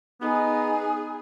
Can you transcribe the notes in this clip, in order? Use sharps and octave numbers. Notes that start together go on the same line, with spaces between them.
B3 D#4 G#4 G#5